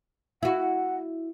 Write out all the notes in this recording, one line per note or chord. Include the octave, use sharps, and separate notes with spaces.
E4 F#4 F#5